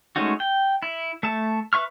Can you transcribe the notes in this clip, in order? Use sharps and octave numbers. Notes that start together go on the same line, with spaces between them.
G#3 A3 C#4 D#4 F#4
G5
E4
A3 E5 A5
B4 E5 C#6 F6